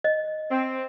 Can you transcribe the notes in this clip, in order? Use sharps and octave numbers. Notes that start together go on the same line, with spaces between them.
D#5
C4